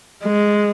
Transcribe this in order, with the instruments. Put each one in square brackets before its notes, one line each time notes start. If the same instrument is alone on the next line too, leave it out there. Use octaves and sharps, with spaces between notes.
[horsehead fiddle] G#3